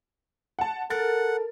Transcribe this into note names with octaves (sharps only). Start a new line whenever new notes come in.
F#5 A5
A4 A#4 F#5 A6